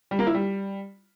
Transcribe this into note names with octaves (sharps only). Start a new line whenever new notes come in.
G3
A#3
E4
G3